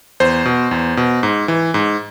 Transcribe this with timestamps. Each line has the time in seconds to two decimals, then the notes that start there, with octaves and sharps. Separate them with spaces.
0.20 E2 C5
0.45 B2
0.71 E2
0.97 B2
1.23 G#2
1.48 E3
1.74 G#2